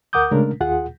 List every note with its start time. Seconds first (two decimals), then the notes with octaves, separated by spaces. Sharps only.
0.13 D2 A#4 F#5 D6 D#6 G6
0.31 C#3 G#3 A3 C#4 D4 A#4
0.60 D#2 F4 G#4 F#5